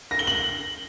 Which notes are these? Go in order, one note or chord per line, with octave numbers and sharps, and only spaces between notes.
A#6
G7
F#7